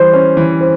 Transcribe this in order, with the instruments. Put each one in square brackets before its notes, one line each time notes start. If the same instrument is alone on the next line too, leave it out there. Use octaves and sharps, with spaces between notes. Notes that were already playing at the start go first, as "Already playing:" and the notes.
Already playing: [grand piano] E3 G3 [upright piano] C5
[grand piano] C#4
E3
[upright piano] C5